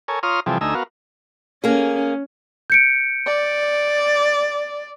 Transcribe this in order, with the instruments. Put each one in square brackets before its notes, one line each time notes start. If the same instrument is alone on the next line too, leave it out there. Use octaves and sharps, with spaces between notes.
[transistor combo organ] A4 A#4 C#5 G#5
F4 C#5 A#5 C6 D#6 F6
C3 E3 F3 G3 G#4 A4
D2 A3 D#4 G#5 A#5 E6
B3 F#4 A#4 F5
[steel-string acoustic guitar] A#3 G#4 [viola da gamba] C#4
[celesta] G6 C#7 D7
[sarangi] D5